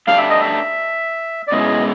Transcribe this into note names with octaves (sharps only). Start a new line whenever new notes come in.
A3 D4 G4 F5
E5
D#5
E5
D5
B2 G#3 C#4 E4 G#4 D#5